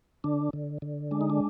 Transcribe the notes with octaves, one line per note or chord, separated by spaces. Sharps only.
D3 D4
D3
D3
G#3 D4
D#4
D4